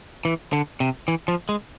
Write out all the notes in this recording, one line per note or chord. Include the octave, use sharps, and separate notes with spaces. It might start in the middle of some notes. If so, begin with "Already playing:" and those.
E3
D3
C3
E3
F3
G#3